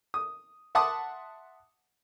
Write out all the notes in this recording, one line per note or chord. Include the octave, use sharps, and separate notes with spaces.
D#6
E5 F#5 A5 C6 D6 D#6